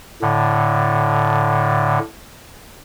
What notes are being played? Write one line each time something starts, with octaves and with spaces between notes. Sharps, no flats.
A2 D3